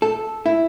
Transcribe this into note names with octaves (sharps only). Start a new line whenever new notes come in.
A4
E4